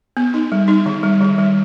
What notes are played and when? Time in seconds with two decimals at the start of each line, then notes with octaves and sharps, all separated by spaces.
0.17 B3
0.34 D#4
0.52 G3
0.68 D#4
0.86 D#3
1.03 G3
1.21 D#3
1.38 G3